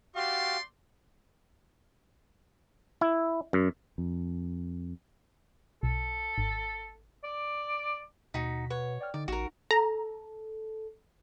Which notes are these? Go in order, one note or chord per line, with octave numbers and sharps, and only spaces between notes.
A3 F#4 G4 D5 F5 C6
E4
F#2
F2
B1 A4
G#1
D5
D#2 B2 D#4 F#4 B6
B4 C#5 F#5
D5 G5 F6
D3 D#4 D5
A1 F#4 A#4
A4 A#5